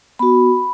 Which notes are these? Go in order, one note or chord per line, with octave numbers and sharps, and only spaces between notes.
B3 F#4 B5